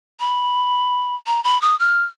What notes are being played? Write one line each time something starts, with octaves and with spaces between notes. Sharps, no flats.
B5
A#5
B5
D#6
F6